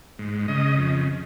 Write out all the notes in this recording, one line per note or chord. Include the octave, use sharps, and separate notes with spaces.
G#2
C#3 D#5
F2